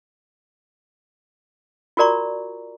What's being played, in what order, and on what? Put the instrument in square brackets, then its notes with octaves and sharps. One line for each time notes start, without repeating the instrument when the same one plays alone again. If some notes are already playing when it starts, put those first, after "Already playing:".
[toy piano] F4 F#4 A#4 D5 A#5 C#6